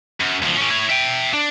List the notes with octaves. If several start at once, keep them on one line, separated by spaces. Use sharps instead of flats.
F#2
D2 F3
A2 C#4
E4 C#5
E5 G5
D4